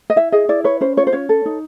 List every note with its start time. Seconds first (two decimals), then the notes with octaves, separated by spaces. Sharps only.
0.10 D#5
0.16 E4 E5
0.32 G#4 D#5
0.49 E4 D5
0.64 B4 C#5
0.81 C#4 C5
0.97 F4 C#5
1.07 C5
1.13 C#4 C#5
1.29 A4
1.46 D#4